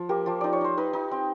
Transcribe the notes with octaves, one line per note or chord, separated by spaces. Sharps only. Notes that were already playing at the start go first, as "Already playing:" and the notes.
Already playing: F3
A#3 G4
F3 F4
D#4 D5
C#5
D#4 C5
D#4 B4
D#4
C4